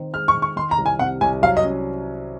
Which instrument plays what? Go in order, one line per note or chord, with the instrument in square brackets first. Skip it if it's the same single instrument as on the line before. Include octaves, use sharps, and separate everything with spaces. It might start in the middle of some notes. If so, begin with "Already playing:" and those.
Already playing: [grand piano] D#3 C4
[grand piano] G#3 [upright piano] F6
[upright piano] C#6
[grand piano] D#3
[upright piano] C#6
[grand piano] D#3 [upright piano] C6
[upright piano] A#5
[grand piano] C2
[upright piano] G#5
[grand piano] C3 [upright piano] F#5
[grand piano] C2 [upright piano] G#5
[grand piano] F#3 [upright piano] F5
[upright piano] D#5
[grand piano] C#4